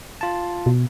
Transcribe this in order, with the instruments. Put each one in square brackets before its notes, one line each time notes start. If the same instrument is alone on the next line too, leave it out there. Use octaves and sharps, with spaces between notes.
[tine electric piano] F4 A5
[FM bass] B2